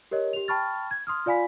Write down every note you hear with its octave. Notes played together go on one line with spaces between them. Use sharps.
G4 A#4 C#5 D#5
G4 F7
G5 A5 B5 C#6 F6 A6
G#6
C6 D#6 F6
F4 D5 F5 G#5 B5 B6